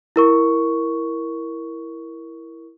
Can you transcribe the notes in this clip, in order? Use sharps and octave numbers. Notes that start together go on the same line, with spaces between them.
E4 A#4 C#6